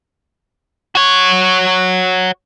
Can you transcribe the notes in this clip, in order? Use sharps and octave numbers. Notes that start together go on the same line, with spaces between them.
F#4 C#5